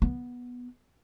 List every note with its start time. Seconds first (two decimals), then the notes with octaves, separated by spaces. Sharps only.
0.02 B3